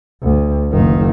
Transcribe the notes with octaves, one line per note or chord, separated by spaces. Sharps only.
D2
F#1 D#3